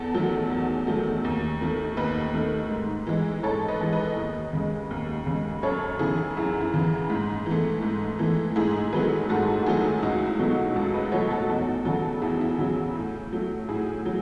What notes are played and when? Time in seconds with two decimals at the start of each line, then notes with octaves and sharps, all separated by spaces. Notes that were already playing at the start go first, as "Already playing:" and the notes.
Already playing: E2 A4
0.14 D#3 F#3 A3
0.50 E2
0.87 D#3 F#3 A3
1.25 D#2
1.61 D#3 A3
1.97 D#2 B4 D#5
2.34 D#3 A3
2.71 G#2
3.07 E3 G#3
3.43 G#2 A4 C#5
3.68 B4 D#5
3.80 E3 G#3
3.93 B4 D#5
4.17 D#2
4.53 C#3 G#3
4.91 D#2
5.26 C#3 G#3
5.63 F#2 A4 C#5
5.99 C#3 E3 E4 G#4
6.37 F#2 E4
6.61 E4
6.74 C#3 E3
7.10 G#2
7.46 E3
7.51 A3
7.83 G#2
8.19 E3 A3
8.56 G#2 E4 G#4
8.93 D#3 F#3 A3 G#4 B4
9.29 G#2 F#4 A4
9.59 F#4
9.66 D#3 F#3 A3 E4 G#4
10.02 C#2 D#4 F#4
10.26 E4
10.39 B2 F#3 A3
10.51 D#4 F#4
10.76 C#2 F#4 A4
10.94 B4 D#5
11.12 B2 F#3 A3 A4 C#5
11.30 F#4 A4
11.49 E2 D#4 F#4
11.85 C#3 F#3 F#4 A4
12.22 E2 E4 G#4
12.41 E4
12.58 C#3 F#3 E4
12.96 A2
13.33 F#3 A3
13.68 A2 E4 G#4
14.06 F#3